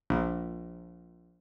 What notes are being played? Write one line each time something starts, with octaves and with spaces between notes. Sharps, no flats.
A#1